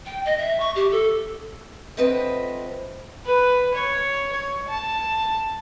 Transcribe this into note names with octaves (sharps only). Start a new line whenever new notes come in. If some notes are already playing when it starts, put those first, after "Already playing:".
G5
D#5
E5
C#6
G4
A4
D3 F3 C4 B4 D#5 E5
B4
C#5
C#5
A5